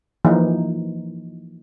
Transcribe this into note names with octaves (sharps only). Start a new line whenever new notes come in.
E3 F3 A#3 D#4